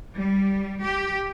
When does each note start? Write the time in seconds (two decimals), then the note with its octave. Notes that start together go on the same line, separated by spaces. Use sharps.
0.15 G3
0.85 G4